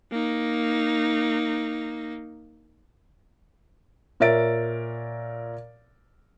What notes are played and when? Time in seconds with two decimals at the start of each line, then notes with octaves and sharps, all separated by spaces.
0.11 A#3 D#4
4.20 A#2 A#4 C#5 E5 A6 D7